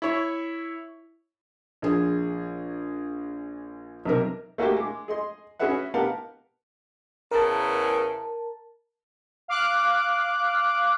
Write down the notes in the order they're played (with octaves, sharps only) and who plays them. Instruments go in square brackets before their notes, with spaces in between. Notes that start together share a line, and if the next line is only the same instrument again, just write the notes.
[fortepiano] E4 C#5
[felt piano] A#1 G#4
B1 C3 A#4
[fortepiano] A3 A#3 F#4 G4
G#3 D6
G#4 D#5 C6
C#4 F#4 G#4 B4 E5 F#5
B3 G4 A#4 F5 F#5 A5
[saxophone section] E2 C#3 E3 [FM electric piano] A#4 A5
[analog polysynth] F5 D6 F#6